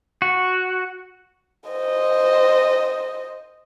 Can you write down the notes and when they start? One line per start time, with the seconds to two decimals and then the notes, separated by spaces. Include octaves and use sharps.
0.22 F#4
1.70 C5 D#5